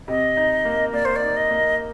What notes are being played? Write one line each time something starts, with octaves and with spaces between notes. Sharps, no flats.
C3 D#5
D#4
A#3
A#3 D5
C5
D5
D#4
D#5
A#3